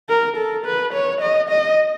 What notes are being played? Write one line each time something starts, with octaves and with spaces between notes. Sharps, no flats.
A#4
A4
B4
C#5
D#5
D#5